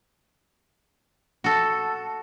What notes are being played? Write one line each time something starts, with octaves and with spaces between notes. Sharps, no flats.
F#4 A4